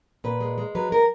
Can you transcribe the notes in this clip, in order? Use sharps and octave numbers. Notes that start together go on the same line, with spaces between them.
A#2 B4
G#3
G#3
F#3 B4
F#3 A#4